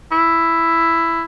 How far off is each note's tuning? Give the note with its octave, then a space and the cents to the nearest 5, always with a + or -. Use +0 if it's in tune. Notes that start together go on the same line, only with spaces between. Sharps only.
E4 +5